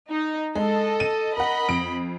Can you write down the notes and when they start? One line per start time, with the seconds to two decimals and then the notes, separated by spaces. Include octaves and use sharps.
0.10 D#4
0.55 G#3 A4 D#5
1.00 D#7
1.37 A#4 D#5 F#5 B5
1.68 F2 D7